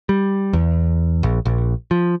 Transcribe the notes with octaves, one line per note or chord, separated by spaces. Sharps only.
G3
E2
A#1
A#1
F3